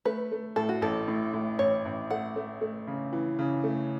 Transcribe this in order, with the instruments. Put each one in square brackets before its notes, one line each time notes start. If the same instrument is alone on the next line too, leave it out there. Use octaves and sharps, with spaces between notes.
[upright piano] A3 [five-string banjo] B4
[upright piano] A3
[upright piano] A2 [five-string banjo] A4
[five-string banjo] F#4
[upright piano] A1 [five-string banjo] A4
[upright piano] A2
A2
[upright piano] A1 [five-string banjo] C#5
[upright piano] A1
[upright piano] A3 [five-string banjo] F#5
[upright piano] A3
A3
C#3
E3
C#3
A3